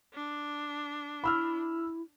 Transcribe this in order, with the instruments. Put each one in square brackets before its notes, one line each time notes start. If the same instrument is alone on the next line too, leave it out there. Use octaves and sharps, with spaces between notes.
[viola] D4
[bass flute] E4 [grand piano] B5 E6 F6